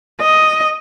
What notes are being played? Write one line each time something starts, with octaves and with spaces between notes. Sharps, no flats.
D#5